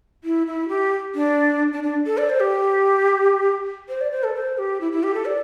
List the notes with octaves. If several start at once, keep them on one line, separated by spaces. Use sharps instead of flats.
E4
E4
G4
D4
D4
D4
A4
D5
C5
G4
C5
D5
C5
A4
C5
G4
E4
E4
G4
A4
D5